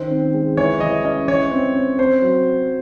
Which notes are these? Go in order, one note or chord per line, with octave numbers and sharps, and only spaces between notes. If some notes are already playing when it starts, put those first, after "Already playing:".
Already playing: D#3 C#4 C5
C4
G#3
E3 C#5
E3 D#5
C#4 D#5
E3 C#5
C4
C4
C4 C5
F#3